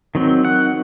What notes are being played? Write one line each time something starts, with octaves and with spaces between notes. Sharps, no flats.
D#3 F#3 C4
F#5